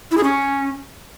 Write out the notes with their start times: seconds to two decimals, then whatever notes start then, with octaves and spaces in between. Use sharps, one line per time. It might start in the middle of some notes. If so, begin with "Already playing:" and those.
0.11 E4
0.17 G#4
0.23 C#4